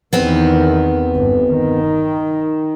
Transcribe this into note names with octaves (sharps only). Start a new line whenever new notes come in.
E2 D#3 B3 C4 B4
G1
D#3